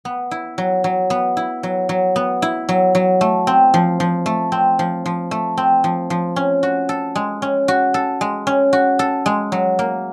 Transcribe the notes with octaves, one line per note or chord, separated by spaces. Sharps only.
B3
E4
F#3
F#3
B3
E4
F#3
F#3
B3
E4
F#3
F#3
A3
C4
F3
F3
A3
C4
F3
F3
A3
C4
F3
F3
C#4
F#4
A4
G#3
C#4
F#4
A4
G#3
C#4
F#4
A4
G#3
F#3
A#3